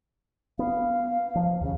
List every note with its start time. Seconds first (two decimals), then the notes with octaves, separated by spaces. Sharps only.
0.59 B3 F5
1.35 F3
1.61 D#2 C#3